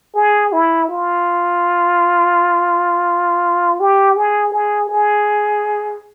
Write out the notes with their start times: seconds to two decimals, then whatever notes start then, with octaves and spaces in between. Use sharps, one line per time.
0.15 G#4
0.53 E4
0.89 F4
3.80 G4
4.17 G#4
4.52 G#4
4.89 G#4